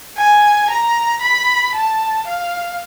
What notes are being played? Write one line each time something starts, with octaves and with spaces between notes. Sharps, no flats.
G#5
A#5
B5
A5
F5